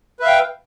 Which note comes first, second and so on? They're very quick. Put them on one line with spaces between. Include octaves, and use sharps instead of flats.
B4 E5 F5 G5